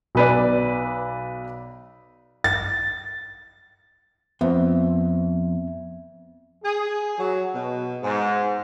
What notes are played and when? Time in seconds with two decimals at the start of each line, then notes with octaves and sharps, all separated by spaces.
0.15 B1 B4 D5
2.44 A6
4.41 F2 B3 C4 E5
6.63 G#4
7.18 F#3
7.54 B2
8.02 G#2